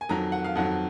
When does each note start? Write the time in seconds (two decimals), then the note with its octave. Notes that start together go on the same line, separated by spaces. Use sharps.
0.01 G#5
0.09 F2 D#3 F#3 A#5
0.32 F#5
0.44 F5
0.55 F2 D#3 F#3 F#5